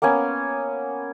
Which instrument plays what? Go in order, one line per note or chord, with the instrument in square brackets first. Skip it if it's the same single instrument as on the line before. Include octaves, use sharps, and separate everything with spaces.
[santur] A#3 B3 C#4 G#5